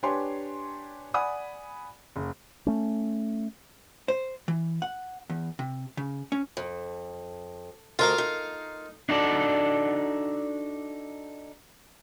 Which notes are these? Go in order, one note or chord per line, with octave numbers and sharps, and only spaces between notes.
D4 G4 B4 C#5 G#5 C6
D5 F#5 G#5 B5 D#6
F#1
A3 C#4
C5
E3
F#5
E2
C3
C#3
C#4
F2
D2 F4 A4 A#4 D#5 F5
D#4
D4 D#4 F#4 A4 D5